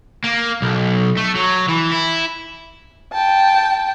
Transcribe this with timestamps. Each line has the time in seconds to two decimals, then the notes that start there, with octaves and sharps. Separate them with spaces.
0.24 A#3
0.62 B1
1.17 A3
1.36 F#3
1.69 E3
1.92 E4
3.13 G5 A5